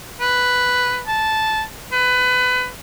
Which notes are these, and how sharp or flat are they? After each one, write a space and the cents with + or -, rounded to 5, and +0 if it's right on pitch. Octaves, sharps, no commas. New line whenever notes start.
B4 +5
A5 -10
B4 +25